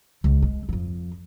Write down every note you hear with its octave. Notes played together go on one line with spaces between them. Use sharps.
C#2
G#3
F2 F3